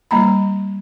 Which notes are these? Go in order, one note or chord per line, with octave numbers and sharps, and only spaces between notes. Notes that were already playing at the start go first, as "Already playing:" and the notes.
G3 A#3 A#5 B5